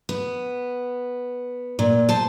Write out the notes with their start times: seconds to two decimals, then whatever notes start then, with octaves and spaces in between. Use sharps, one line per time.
0.09 B3
1.79 A#2
2.09 C5 A5